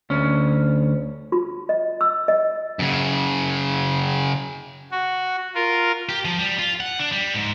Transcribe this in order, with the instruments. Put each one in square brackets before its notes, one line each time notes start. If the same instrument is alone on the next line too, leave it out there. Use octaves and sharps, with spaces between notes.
[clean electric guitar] D2 C#4
[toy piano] F4
D#5
E6
D#5
[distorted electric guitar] F#2 C#3
[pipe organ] F#4
F4 A#4
[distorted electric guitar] G4
F3
G3
F4
F#5
D4
G3
G#2